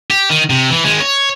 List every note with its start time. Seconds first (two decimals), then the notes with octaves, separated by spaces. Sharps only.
0.11 G4
0.30 D#3
0.50 C3
0.70 E3
0.85 D#3 G#3
1.00 C#5